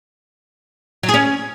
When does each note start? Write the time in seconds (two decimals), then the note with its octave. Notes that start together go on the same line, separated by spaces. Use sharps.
1.03 F#3
1.09 G#4
1.14 C#4